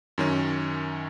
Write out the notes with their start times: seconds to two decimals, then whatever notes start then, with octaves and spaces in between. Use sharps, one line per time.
0.18 F#2 D#3 C#4